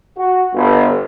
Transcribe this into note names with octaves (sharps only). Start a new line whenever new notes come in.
F#4
G1